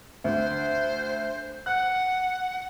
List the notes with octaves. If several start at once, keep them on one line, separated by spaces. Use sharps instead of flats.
D2 C5
F#5 F#6